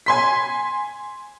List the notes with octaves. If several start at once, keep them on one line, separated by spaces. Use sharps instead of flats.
G#5 C6 B6